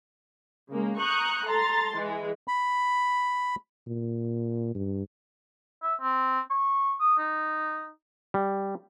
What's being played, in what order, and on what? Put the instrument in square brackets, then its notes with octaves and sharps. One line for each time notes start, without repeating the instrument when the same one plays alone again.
[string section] C#3 G#3 A#3
A#5 C#6 D#6 F#6 G6
A4 A#5 C6 A6
E3 G#3
[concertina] B5
[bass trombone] A#2
G2
[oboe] E5
C4
C#6
D#6
D#4
[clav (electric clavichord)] G3